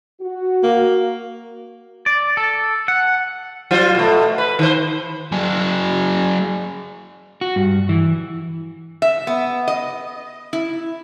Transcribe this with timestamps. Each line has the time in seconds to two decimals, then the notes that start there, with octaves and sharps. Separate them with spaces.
0.21 F#4
0.63 A#3
2.06 D5
2.37 A4
2.88 F#5
3.71 F#3 F4 C5
3.95 B2 A3
4.38 B4
4.59 D#3 C5
5.32 F#3 G#4
7.41 F#4
7.56 G2
7.89 E3
9.02 E5
9.27 B3
9.68 D#5
10.53 E4